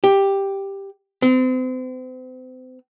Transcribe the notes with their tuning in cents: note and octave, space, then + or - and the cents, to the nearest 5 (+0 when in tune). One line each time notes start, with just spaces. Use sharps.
G4 +5
C4 -40